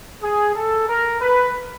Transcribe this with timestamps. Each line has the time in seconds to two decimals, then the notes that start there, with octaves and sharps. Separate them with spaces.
0.22 G#4
0.56 A4
0.89 A#4
1.21 B4